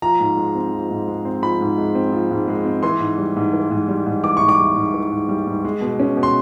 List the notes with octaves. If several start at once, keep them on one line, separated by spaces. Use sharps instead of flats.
F3 A#5
G#2
G#3
C4
F3
G#2
G#3
C4
F3 B5
G#2
G#3
C4
F3
G#2
G#3
C4
E3 C6
G#2
G3
G#2
E3
G#2
G3
G#2
E3 D6
G#2 C#6
D6
G3
G#2
E3
G#2
G3
G#2
G#3
B2
C#4
B2
C6